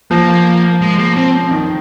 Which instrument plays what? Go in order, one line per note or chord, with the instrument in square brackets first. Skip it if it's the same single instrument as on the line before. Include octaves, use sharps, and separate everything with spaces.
[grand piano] F3 [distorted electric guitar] A#3
[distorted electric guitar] G#3
A#3
C4
[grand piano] D#3